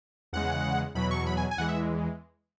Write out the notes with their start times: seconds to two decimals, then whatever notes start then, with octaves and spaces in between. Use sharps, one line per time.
0.33 E2 C#3 G#3 F#5
0.95 E2 B2 F#3 B5
1.11 C#6
1.26 B5
1.37 G#5
1.51 G#5
1.57 E2 E3 G#3 F#5
1.69 E5